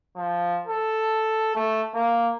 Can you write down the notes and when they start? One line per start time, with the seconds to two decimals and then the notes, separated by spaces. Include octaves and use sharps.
0.16 F3
0.67 A4
1.56 A3
1.95 A#3